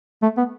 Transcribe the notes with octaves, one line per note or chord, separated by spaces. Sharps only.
A3
B3